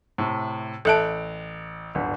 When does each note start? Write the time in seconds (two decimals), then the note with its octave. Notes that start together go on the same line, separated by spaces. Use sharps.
0.18 A2 C3
0.85 A1 A4 E5 A5 F#6 D7
1.95 D1 G1 D3